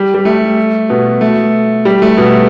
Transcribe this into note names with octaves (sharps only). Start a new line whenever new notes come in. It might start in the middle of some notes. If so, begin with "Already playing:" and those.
Already playing: G3
G3
A3
B2 B3
A3
G3
A3
B2 B3